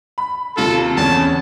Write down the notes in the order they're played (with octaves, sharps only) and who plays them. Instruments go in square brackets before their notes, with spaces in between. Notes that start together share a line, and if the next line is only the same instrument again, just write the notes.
[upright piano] B5
[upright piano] D#2 C3 F4 [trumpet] A4
[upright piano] E2 C#3 C#4 [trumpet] A5